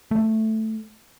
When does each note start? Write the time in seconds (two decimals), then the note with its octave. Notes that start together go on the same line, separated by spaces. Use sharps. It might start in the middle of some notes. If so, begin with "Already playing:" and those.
0.11 A3